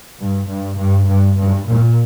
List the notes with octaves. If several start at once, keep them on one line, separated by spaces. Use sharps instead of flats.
G2
G2
G2
G2
G2
A#2